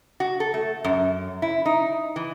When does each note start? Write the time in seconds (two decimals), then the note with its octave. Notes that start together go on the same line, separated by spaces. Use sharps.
0.20 F#4
0.40 A4
0.54 A3
0.84 F#2
1.42 E4
1.66 D#4
2.16 E3